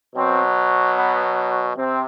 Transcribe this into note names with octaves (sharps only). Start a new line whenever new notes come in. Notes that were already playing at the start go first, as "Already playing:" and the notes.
B2 F#3 C4
B3
C3 C4